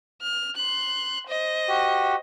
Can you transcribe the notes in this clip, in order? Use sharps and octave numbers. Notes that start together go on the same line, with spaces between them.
F6
C6 F#6
C5 D#5
F#4 G4